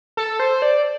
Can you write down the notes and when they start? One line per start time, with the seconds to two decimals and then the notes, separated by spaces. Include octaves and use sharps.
0.17 A4
0.40 C5
0.62 D5